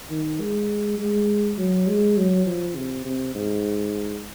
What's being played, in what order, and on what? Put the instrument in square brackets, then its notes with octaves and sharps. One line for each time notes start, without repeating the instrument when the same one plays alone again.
[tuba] D#3
G#3
G#3
F#3
G#3
F#3
F3
C3
C3
G#2